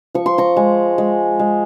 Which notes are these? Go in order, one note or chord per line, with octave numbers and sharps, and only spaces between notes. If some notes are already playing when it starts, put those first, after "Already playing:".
F3 C#6
C6
A#5 C#6
G#3
G#3
G#3